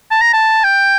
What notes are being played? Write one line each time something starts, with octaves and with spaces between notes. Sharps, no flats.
A5
A#5
A5
G5